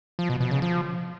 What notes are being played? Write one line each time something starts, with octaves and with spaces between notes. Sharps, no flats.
F3
B2
B2
C#3
F3